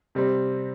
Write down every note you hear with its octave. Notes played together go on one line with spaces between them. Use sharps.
C3 G3 C4